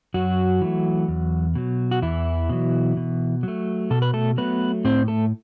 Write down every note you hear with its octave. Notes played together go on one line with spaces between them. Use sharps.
F#2 F#3 F#4
E3 A3
E2
B2 F#3
F#4
E2 E3 E4
B2 F#3
B2
F#3 A3
B2 A4
B4
A3 A4
F#3 A3 B3 B4
A2 C4 C5
A3 A4